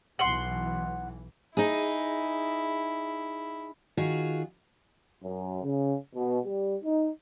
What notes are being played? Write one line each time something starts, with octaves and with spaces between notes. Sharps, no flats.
B1 E3 F#5 C6
D#4 E4 G#4
D#3 F4 F#4 G#4 F5
F#2
C#3
B2
G3
D#4